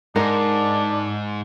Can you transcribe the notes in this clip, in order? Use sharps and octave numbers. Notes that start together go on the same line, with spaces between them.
G#2 G#3 D4 A#4